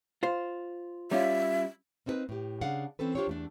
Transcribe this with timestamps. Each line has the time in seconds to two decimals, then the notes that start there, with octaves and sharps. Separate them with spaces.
0.23 F4 C5
1.11 G3 C#4 F4 E5
2.06 A#3 C4 D#4 A4 B4
2.29 A2 G4
2.61 C#3 D4 G#4 F5 F#5
2.99 E3 C4 C#4 A4 B4
3.15 D4 F4 G4 C5 C#5
3.27 E2 A3 D4